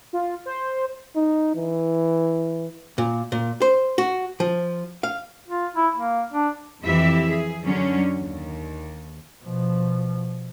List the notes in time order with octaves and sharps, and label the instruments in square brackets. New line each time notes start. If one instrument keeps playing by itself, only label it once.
[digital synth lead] F4
C5
[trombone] D#4
E3
[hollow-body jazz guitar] A#2
A#2
C5
F#4
F3
F5
[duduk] F4
E4
A#3
D4
[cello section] F2 E3 E4 G4 E5
G#4
F#2 D3 F#3 C#4 D4
D#2
[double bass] B2 F3